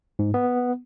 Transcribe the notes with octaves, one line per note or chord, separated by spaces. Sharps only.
G#2
B3